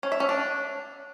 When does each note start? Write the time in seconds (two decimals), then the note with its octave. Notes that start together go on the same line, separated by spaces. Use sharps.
0.03 C#4
0.12 E5
0.20 C#4
0.29 D4